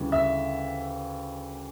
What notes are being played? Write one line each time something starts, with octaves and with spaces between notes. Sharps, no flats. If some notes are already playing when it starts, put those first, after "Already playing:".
Already playing: D2 C#3 E3 G3
E5